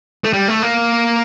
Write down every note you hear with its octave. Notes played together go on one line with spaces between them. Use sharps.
A3
G3
A3
A#3